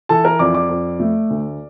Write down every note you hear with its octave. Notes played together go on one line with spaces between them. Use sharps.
E3 A4 A5
A#4 A#5
F2 D5 D6
D5 D6
F2
A3
D2